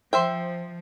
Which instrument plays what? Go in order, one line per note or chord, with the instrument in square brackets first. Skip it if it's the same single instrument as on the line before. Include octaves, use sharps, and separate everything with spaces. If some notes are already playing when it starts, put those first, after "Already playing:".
[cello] F3 [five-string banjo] C5 E5 G5